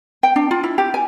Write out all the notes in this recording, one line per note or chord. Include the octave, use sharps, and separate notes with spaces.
G5
D4
F4
E4
G4
G#5